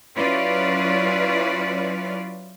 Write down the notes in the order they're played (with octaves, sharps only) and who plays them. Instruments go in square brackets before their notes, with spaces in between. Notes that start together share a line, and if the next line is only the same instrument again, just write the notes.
[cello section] F#3 C#4 E4 F4 B4 D5